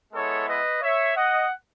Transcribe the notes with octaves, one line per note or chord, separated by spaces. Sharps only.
G#3 B3 E4 A4 C#5
B4 D#5
C#5 E5
D#5 F#5